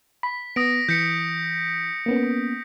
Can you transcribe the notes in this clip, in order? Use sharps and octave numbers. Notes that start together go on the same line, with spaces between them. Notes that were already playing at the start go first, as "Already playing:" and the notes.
B5 B6
B3 D#6 A#6 D7
E3 G6 B6 C#7
A#3 B3 C#4